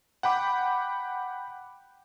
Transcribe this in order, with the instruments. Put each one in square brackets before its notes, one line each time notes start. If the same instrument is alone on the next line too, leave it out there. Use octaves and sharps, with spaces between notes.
[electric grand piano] F#5 G5 B5 D6